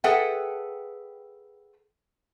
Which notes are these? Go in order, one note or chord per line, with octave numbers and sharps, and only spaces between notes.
G#4 A4 B4 E5 F#5 G5